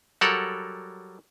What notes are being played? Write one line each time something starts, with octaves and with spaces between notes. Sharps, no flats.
F#3 G3 A4 A#4 F#5